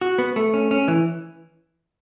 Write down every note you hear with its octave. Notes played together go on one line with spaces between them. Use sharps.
F#4
B3
A3
C#4
C#4
E3